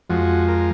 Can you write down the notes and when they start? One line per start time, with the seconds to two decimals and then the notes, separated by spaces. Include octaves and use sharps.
0.10 F2 F3 G#3 F#4
0.48 A#4